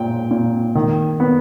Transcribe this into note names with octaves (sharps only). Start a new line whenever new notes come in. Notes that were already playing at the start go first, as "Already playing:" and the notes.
Already playing: A#2 G5
A#2
D#3
B3